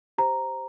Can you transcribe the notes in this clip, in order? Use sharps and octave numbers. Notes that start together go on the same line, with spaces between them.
G4 C5 A#5